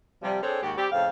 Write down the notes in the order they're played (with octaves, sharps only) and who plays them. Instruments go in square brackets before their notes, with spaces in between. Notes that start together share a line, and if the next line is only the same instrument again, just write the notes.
[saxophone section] C3 F3 G3
C4 D4 G#4 A4 C#5
D#2 G#2 F#4 G4
G3 C4 G4
F2 A2 C#3 F5